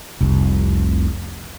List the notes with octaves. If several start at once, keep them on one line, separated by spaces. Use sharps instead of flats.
F1 C2